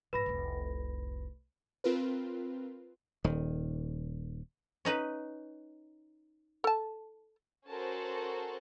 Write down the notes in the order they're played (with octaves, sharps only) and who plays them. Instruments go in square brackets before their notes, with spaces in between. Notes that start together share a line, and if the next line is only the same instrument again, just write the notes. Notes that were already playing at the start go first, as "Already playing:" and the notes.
[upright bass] G#2 F3 [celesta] B4 B5 A#6
[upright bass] F1 C2
[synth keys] C4 F4 A#4 B4
[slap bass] D#1 D#3
[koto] C#4 D#4 B4
[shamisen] A4 A5
[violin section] C#4 F#4 A4 A#4 C5 A5